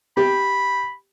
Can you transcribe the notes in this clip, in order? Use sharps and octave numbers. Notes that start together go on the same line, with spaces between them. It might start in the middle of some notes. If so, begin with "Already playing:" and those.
G4 B5